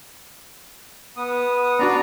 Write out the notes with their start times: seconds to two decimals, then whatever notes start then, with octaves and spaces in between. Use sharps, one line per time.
1.17 B3 D#6
1.79 B3 D4 F#4 D5 A#5